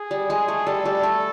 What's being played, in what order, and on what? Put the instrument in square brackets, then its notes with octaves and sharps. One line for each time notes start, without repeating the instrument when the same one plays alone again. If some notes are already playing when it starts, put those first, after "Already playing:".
Already playing: [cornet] G#4
[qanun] G3
G#3
A3
[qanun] G3 [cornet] A4
[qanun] G3
A3